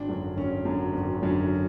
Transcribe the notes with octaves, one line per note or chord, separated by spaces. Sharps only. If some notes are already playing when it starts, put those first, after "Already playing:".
Already playing: G#1 D4
F#2 D3 F#3
G#1 C#4
F#2 D3 F#3
G#1
F#2 D3 F#3